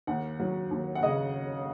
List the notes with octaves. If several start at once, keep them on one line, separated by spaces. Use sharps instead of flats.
D#2 F#5
F#3
D#2
F#5
C#3 D#5